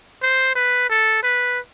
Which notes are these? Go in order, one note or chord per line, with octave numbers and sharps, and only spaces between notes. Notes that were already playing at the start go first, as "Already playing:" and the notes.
C5
B4
A4
B4